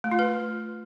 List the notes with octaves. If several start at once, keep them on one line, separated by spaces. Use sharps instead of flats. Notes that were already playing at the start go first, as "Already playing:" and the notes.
A3
F4
B4